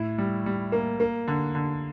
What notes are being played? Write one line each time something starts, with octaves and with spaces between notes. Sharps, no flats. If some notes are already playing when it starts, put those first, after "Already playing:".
Already playing: A2 E4
G3
G3
A#3
A#3
D3
D3